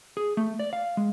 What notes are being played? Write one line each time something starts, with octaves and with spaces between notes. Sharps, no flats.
G#4
A3
D5
F5
G#3